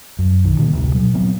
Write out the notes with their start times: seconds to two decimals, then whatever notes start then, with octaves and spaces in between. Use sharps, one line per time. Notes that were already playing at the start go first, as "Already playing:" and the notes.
0.19 F#2
0.44 B1 D#3
0.59 A#2 D3 D#3 A#3
0.73 A1 D2 C3 G3
0.94 B2 F#3
1.13 A#2 F#3 B3 C4